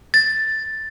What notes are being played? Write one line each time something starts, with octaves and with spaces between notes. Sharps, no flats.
A6